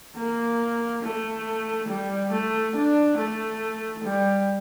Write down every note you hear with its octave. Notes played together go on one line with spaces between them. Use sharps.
A#3
A3
G3
A3
D4
A3
G3